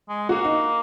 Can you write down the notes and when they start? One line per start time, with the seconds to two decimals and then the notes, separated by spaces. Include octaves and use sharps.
0.09 G#3
0.29 A#3 F#4
0.45 D#4